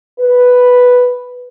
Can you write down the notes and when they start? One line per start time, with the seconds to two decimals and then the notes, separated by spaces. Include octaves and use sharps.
0.19 B4